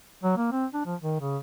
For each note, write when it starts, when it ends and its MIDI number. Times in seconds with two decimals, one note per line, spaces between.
0.24 0.35 54
0.37 0.50 58
0.52 0.66 60
0.74 0.83 62
0.86 0.95 53
1.01 1.19 51
1.21 1.38 49